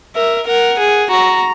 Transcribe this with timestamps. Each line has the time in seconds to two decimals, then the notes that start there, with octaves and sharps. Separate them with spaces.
0.16 A#4 E5
0.47 A#4 F#5
0.79 G#4
1.11 F#4 A#5